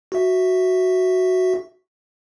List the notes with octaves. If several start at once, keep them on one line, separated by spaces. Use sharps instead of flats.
F#4 E5